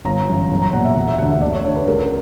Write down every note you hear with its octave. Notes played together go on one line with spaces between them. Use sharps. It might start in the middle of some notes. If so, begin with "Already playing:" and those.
G1 A#5
F#2 E3
B1
A#5
A#2 F#5
E5
E1 F#5
E5
D2 D3 F#5
E5
D2 D5
C#5
D3 C#5
B4
C#2 A#4